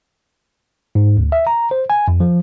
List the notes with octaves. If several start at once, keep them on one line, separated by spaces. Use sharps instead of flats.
G#2
D2
E5
A#5
C5
G#5
F2
F3